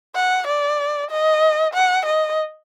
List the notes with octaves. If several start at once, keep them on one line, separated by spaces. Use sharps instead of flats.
F#5
D5
D#5
F#5
D#5